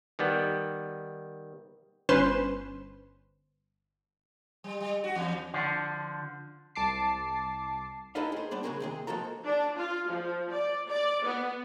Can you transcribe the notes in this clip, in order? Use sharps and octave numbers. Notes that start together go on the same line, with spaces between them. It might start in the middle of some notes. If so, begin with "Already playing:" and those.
D#3 G3 B3
G1 C#4 B4 C5 C6 E7
G3
G3
F#4
E2
D3 F3
C2 A5 D6 C7
D#4 E4 A4 B4 D#5 F5
G#4 C5
G3 B3 D4 D5
C#3 F3 G#3 F#4 G#4 A#4
D#2 C3 G#4
F3 G#3 A#3 F#4 A4 A#5
D4
F4
F3
D5
D5
B3